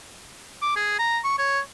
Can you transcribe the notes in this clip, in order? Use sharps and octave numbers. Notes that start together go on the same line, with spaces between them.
D6
G#4
A#5
C#6
C#5